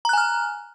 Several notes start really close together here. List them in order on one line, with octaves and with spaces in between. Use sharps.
A#5 F#6 G#5 F6